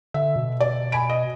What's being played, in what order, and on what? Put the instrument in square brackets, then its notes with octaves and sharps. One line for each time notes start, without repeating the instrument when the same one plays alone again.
[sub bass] D3 [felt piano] E5
[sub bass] B2
[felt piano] D5
G#5 B5 D7
D#5